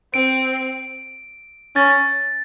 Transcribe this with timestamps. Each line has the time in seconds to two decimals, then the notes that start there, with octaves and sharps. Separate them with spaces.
0.14 C4 D7
1.75 C#4 A6